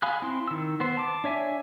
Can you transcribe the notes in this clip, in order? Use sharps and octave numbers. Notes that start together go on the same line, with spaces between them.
F5 G#5 B5 D#6 F#6
C4 E4 C6
D#3 E6
B3 C5
A5 D6
D4 C#5 E5 G#5